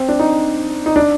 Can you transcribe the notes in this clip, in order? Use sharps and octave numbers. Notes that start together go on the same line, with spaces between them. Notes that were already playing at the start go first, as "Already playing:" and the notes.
Already playing: C4
D4
D#4
D#4
D4